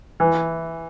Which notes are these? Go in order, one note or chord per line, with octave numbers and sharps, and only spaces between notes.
E3